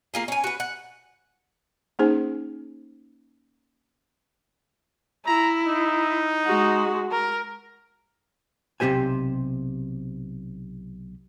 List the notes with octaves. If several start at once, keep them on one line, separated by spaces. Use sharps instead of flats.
A#3 F4 G#4
C#4 G#5
F#4 B4
F#5
A#3 C#4 D#4 G#4 C5 G#5
E4 A#5
D#4
G#3 F#4
A#4
B1 C3 G#3 G4 C5 G#5